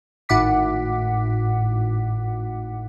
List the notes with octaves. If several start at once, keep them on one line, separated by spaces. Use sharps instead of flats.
G#1 A2 F#5 D6 B6